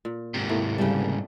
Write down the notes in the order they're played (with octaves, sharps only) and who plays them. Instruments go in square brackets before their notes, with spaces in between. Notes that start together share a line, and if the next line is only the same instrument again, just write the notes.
[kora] A#2
[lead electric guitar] G#2 C3
[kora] A2 A3 A#3
[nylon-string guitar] C#3 G3 [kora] D4 F5 G5